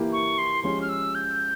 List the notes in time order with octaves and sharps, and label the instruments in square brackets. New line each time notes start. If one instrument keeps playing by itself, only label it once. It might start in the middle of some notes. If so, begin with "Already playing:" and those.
Already playing: [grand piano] E3 A#3 E4 G4
[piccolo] C#6
C6
[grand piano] F3 G#3 C#4 G4 [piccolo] C6
[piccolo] F6
E6
G6